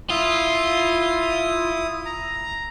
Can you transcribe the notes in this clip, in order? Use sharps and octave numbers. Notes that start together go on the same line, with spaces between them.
E4 F4 D#6
A#5